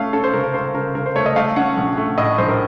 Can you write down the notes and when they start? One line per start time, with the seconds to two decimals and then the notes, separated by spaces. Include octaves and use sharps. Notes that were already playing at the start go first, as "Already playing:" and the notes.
Already playing: A3 C#4 F5
0.13 C#4 A4
0.24 C5
0.34 C#3 A#4
0.44 A#4
0.54 C#2 C5
0.74 C#3 A#4
0.95 C#3 A#4
1.06 C5
1.16 A3 C#5
1.26 D#5
1.36 A3 F5
1.56 C#4 F#5
1.77 A#1
1.97 A3
2.18 A2 D#5
2.38 A#1 C5
2.48 A#4